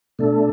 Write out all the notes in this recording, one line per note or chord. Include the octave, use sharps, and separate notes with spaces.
B2 A3 D4 A4